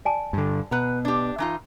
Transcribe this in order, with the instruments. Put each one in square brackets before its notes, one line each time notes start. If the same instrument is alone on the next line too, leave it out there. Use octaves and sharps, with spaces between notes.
[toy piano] D5 G#5 A5
[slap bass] G2 D3
[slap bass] B2 [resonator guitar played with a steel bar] B4 F#5 A#5
[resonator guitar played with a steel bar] D4 G4
E3 D#4 F4